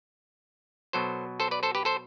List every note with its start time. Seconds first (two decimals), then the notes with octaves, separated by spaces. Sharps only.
0.93 B2 F#3 A4 C5
1.40 A4 C5
1.51 B4 D5
1.63 A4 C5
1.75 G4 B4
1.85 A4 C5